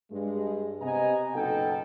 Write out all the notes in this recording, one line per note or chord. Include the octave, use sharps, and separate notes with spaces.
G2 G#3
C3 B3 D#5 G#5 A#5
F#1 B2 D#4 A4 F#5 G5